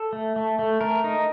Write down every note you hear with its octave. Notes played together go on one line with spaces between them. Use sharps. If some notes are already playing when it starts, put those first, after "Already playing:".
Already playing: A4
A3
A3
A3
A3 A#4
D#4